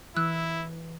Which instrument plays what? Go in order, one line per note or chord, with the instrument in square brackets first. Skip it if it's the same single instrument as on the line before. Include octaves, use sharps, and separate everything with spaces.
[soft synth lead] E3 [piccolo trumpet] E4 [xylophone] E6 F#6